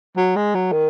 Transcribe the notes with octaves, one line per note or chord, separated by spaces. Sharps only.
F#3
G#3
F#3
D#3